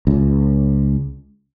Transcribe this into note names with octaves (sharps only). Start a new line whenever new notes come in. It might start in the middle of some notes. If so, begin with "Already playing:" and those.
C#2